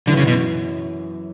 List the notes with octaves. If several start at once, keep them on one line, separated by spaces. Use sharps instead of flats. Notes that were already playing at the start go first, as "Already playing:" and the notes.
F#2 D3 E3 B3 F#4
C#3
B2